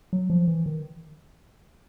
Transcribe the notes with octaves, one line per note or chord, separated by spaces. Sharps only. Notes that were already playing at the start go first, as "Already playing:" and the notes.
F#3
F3
E3
D#3